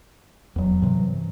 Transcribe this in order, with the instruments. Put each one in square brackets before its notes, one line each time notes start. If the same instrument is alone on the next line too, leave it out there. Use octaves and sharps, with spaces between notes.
[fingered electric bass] D#1 E2 [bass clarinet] F#3
[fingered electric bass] G2 C3 E3